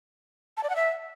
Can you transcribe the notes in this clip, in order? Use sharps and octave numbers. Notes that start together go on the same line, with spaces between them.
A5
D5
F#5
E5